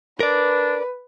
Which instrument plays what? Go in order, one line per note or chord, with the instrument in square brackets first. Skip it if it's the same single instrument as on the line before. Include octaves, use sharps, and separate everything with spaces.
[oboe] D4 [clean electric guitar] A#4 D5 [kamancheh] B4